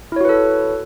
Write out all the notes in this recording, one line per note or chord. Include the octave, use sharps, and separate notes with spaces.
E4 F#4 A4 B4 C#5